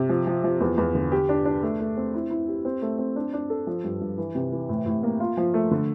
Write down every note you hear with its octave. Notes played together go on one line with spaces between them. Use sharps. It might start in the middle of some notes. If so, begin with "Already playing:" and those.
Already playing: C3
F3
F3
F3
E2
E2
D3
G4
D4
D4
A3
A3
C4
E4
E4
G4
C4
A3
C4
D4
D4
A4
F3
G2
G2
E3
C3
E3
A2
A2
A#3
F4
F3
A3
D3